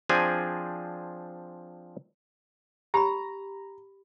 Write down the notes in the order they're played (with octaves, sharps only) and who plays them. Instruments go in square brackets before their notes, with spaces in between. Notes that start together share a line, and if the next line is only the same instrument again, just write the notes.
[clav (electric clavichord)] F3 C4 D4 G#4 G#5
[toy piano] G4 B5 [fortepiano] A#5